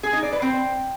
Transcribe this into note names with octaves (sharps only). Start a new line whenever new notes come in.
G#4
D#4
D5
B4
C4